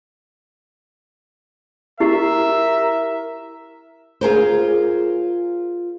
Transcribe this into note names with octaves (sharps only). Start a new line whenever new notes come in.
E4 G4 A#4 E5
F4 G#4 A#4 C5